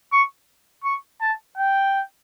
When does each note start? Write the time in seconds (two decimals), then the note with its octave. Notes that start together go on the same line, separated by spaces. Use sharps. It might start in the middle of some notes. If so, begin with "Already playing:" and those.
0.12 C#6
0.84 C#6
1.21 A5
1.57 G5